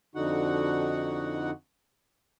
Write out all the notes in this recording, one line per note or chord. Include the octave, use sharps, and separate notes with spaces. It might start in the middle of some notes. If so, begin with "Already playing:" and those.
F2 D3 D#4 F#4 F#5